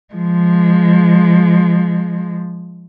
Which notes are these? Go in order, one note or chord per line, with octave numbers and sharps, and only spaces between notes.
F3 G#3